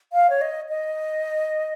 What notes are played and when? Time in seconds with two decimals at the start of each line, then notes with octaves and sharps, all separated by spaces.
0.13 F5
0.30 C#5
0.41 D#5
0.69 D#5